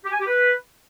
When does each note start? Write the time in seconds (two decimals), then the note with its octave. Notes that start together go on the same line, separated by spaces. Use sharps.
0.04 G4
0.11 G#5
0.19 G4
0.26 B4